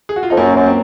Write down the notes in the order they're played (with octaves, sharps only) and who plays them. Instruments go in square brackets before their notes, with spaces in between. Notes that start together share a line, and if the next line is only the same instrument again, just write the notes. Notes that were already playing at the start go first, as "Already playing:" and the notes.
[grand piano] G#4
F#4
F4
[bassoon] F2 [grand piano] D#4
[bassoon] F#2 [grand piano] A#3 C#4
[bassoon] F#2
[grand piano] C4